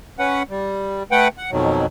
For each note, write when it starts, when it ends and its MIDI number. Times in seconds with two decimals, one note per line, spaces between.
0.19 0.43 61
0.19 0.43 71
0.19 0.43 78
0.50 1.03 55
1.11 1.28 57
1.11 1.28 71
1.11 1.28 78
1.11 1.28 79
1.37 1.51 78
1.51 1.86 41
1.51 1.86 47
1.51 1.86 51
1.51 1.86 54